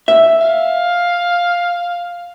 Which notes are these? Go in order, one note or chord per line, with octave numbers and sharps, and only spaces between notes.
E5
F5